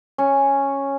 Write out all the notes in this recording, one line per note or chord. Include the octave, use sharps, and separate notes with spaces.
C#4